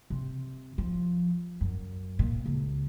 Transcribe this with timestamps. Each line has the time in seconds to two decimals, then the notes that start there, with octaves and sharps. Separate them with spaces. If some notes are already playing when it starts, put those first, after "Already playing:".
0.10 C3
0.78 F3
1.61 F#2
2.19 A#2
2.46 C#2